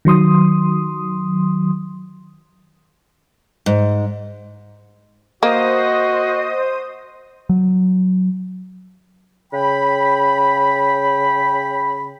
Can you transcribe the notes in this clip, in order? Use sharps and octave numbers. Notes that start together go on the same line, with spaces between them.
D#3 F#3 C6 D#6
G#2
A#3 F#4 C5 D#5 D#6
F#3
C#3 G5 B5